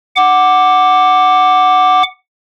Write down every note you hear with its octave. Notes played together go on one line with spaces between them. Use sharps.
F#5 D6